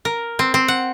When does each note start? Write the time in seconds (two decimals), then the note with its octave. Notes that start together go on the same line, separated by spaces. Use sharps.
0.05 A#4
0.39 C4
0.54 C4
0.68 F#5